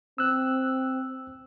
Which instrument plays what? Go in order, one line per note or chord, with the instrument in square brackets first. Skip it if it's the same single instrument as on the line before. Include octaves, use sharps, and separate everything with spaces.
[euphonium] C4 [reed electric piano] E6 F#6